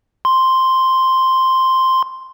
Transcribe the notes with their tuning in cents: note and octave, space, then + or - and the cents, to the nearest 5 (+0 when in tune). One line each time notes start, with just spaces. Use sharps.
C6 +0